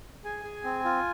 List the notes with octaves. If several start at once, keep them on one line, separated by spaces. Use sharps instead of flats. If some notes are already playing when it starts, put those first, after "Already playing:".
G#4 G#5
G#4
C4
F4